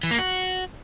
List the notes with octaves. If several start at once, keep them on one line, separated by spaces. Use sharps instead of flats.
E3
A#3
F#4